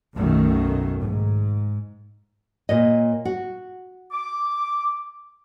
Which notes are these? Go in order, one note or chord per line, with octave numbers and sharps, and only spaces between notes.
B1 F#2 B2 D#3 A3
G#2
A#2 C#5 D#5
F#4
D6